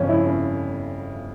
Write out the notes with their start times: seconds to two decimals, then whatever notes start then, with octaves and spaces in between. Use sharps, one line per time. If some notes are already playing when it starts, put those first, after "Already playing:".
Already playing: G1 F2 C#3 C#4
0.09 E4
0.27 C#4